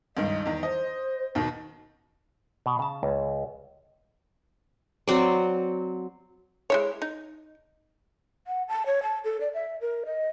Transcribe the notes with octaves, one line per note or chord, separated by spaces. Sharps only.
C#2 G2 D#3 D#5
E2 D#3
C5 D#5
D#2 B2 D#3
B2
C#3 A5
C#2
F#3 C4 D5
G#3 E4 C#5
D#4
F#5
A5
C#5
A5
A4
D5
E5
A#4
D#5